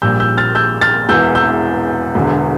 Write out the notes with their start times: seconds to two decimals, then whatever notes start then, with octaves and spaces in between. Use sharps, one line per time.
0.02 A#1 A#2 G3 E6 G6
0.20 E6 G6
0.37 F6 A6
0.55 E6 G6
0.81 F6 A6
1.09 E1 E2 E3 E6 G6
1.35 E6 G6
2.15 E1 E2 D3